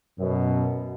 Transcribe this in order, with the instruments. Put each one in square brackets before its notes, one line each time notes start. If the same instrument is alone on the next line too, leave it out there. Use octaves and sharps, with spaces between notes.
[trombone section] F#2 B2